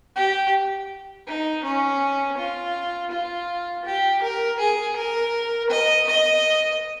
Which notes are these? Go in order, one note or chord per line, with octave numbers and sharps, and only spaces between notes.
G4
D#4
C#4
F4
F4
G4
A#4
G#4
A#4
D#5
D#5